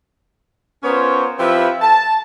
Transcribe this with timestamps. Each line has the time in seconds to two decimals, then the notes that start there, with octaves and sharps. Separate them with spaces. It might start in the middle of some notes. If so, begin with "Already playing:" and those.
0.83 B3 C#4 F4 A#4 C5 C#5
1.38 F3 C4 E4 G4 B4 E5
1.81 A5